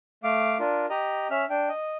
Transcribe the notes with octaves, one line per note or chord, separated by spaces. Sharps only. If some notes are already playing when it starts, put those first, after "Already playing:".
A3 F5 D6
D4 F4 A#4
G4 D#5 A#5
C#4 E5 F6
D4 G5
D#5